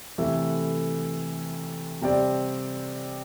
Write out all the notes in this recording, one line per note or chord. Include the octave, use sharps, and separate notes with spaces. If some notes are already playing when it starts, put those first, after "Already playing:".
C3 E3 A3 E4 A4
C3 G3 C4 G4 D5